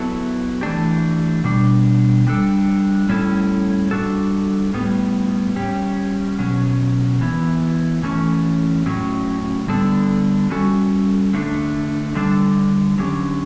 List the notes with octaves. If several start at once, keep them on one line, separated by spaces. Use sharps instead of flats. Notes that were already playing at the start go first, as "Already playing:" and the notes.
Already playing: F#3 B3 E4 A4
E3 A3 D4 G4
B2 G3 D4
G3 D4 A4
A2 G3 C#4 E4 A4
G3 D4 F#4 A4
A2 G3 B3
G3 C#4 G4
B2 F#3 C#4
E3 B3 E4
E3 A3 C#4
A2 F#3 C#4
D3 G3 B3 D4 A4
G3 C#4 F#4 A4
D3 A3 D4
D3 G3 D4 A4
D3 F#3 C#4 G4